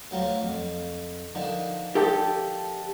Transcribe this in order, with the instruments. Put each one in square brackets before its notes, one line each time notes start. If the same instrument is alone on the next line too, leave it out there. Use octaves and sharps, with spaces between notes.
[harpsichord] D2 F#3 F4
F2
D3 D#3 F3
[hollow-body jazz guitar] G4 A4 G5